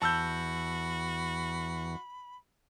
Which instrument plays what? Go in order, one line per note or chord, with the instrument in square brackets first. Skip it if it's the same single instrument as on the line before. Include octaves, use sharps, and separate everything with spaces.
[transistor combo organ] E2 [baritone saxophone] F#4 [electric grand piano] A5 E6 G6 [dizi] B5